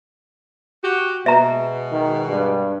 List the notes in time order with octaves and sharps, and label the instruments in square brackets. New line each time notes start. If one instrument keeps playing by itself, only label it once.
[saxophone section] F#4 G4
[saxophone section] B2 G#3 [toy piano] E5 A#5
[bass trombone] D#3
G2